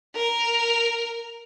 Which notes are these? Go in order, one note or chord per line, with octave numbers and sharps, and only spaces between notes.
A#4